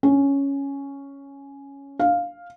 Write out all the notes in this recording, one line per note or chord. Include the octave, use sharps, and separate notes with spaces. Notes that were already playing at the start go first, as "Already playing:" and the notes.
C#4
F5